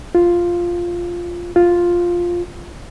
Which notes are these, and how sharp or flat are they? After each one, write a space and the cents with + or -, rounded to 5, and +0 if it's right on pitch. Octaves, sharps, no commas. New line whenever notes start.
F4 +0
F4 +5